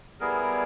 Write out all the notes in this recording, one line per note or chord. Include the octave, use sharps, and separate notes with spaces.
G3 B3 E4 G#4 A#4